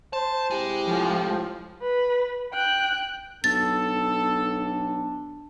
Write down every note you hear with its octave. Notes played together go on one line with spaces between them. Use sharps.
C5 A5
C3 G#3 E4 G4
A2 F3
B4
G5 F#6
B1 D4 A4 A6